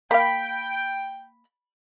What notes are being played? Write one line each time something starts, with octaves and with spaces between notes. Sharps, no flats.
A#3 F5 G5 B5